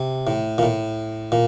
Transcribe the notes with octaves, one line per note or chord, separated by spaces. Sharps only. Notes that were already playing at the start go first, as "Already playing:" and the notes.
Already playing: C3
A2
A#2
A2
A#2